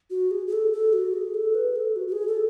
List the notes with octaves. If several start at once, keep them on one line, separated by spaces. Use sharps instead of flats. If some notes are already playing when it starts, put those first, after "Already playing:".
F#4
G#4
G#4
A4
A4
F#4
G#4
A4
B4
A4
F#4
F#4
G#4
A4